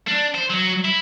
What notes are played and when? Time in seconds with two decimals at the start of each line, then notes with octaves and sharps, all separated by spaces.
0.08 D4
0.35 C5
0.50 F#3
0.85 E4